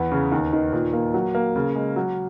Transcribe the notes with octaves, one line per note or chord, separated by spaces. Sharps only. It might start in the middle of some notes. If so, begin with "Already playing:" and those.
Already playing: E2 B3
C#3
D#2
D#3
A#2
A#3
F#3
A#3
C#3
G#3
F#3